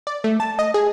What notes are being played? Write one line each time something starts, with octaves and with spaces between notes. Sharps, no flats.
D5
A3
A5
D#5
G#4